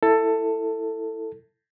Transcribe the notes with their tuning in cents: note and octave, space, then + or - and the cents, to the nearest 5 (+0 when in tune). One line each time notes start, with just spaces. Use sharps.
E4 +0 A4 +15